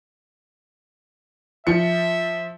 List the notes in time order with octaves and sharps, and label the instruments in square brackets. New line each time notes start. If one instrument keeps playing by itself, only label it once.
[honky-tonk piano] F3 C#7 [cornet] E5